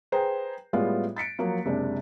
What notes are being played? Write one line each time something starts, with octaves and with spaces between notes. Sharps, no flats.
G#4 B4 C5 G5 A#5
A2 G3 G#3 B3 F4
A6 B6 C#7 D7
F3 F#3 A#3
F#1 C3 G#3 D4